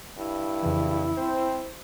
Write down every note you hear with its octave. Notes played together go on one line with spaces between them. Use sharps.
G2 E4
F2 C#3 E3
C4 C5